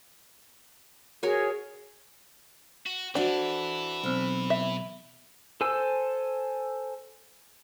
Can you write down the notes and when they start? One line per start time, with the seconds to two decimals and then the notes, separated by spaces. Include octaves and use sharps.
1.23 F#4 G#4 A#4 C#5
2.86 F#4
3.15 E3 D4 E4 F#4 A4 C5
4.04 B1 C4
4.50 E5
5.61 A4 C5 G#5 E6